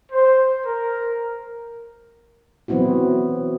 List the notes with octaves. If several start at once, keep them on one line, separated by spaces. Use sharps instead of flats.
C5
A#4
E3 F#3 B3 C4 E4 F#4